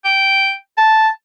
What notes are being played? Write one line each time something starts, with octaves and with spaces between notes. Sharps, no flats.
G5
A5